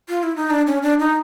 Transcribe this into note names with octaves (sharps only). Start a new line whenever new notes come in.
F4
E4
D#4
D4
C#4
D4
D#4